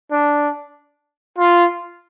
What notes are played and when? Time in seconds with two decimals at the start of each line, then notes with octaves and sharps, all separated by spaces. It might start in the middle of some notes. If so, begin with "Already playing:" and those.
0.11 D4
1.38 F4